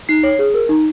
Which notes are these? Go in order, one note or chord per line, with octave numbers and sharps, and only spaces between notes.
D#4 C7
C#5
G#4
A#4
D#4